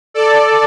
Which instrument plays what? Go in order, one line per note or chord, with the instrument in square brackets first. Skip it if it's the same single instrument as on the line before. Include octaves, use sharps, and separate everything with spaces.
[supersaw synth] A4 D5